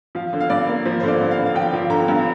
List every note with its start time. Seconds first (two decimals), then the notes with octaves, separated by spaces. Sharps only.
0.15 F3 F5
0.33 D3
0.40 F5
0.50 G2 D5
0.67 A#3
0.85 F3 C5
1.00 D3 C5
1.08 D5
1.21 G2
1.31 F5
1.38 D3
1.46 F5
1.55 F3 G5
1.73 F3
1.90 D3 A#5
2.08 G2